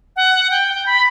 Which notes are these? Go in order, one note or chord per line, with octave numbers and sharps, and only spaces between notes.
F#5
G5
G5
B5